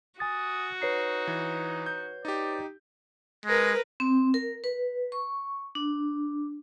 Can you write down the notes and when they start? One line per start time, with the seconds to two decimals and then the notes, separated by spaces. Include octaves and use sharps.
0.20 F#4 G#5 D#6 A6
0.82 D#4 B4 C#5 C7
1.27 E3
1.86 G6
2.25 D#4 G4 D5
3.46 G#3 A#4 B4 A#6
4.00 C4
4.34 A#4
4.64 B4
5.12 C#6
5.75 D4